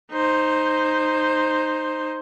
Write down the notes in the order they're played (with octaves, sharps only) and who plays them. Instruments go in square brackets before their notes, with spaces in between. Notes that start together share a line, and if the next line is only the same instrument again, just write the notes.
[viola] D#4 C5